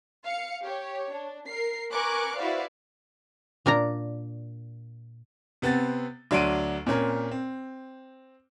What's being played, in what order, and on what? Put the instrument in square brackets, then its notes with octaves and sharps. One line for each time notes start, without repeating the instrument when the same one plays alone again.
[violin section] F5 C#7
G4 C#5
D4
A#4 C7
A#4 B4 G#5 C#6 D6 F#6
E4 F#4 B4 C5 D5 F5
[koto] A#2 D4 A#4 A#5
[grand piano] C3 B3 C4 A6
D2 F#3 D4 C6 D7 D#7
A#2 C4 C#4 A#4
C4